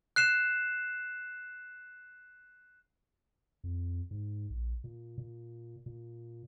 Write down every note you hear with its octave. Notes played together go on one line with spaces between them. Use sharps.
F#6 C7 E7
F2
G#2
A#1
A#2
A#2
A#2